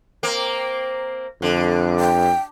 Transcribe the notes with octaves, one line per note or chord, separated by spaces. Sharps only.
A#3 C4
F2 D3
G5